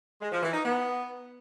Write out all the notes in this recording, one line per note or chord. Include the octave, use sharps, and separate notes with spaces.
G#3
F3
E3
D#4
B3